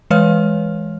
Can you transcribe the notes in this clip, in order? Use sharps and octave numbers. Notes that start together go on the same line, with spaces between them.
E3 G#3 B4 C#5 F5 F6